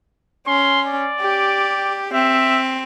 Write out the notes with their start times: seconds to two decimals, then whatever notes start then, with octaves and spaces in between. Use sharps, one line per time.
0.47 C#4 C6
0.86 D5
1.21 G4
2.14 C4 E5